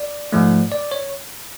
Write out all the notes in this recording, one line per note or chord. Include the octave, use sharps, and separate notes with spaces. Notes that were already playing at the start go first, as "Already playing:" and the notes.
Already playing: D5
G#2 F3 A3
D5
C#5